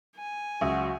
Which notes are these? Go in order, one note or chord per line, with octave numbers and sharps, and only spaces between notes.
G#5
C#2 F#3 F#4 E5 D#6